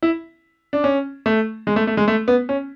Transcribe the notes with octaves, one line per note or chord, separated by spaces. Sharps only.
E4
D4
C#4
A3
G#3
A3
A3
G#3
A3
B3
C#4